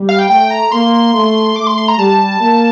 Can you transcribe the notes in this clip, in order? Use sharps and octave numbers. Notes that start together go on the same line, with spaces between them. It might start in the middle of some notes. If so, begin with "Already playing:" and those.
Already playing: G3
F5
G5
A3 G5
A#5
A#3 C6
A3
A3 D6
C6
C6
A#5
G3 A5
A#3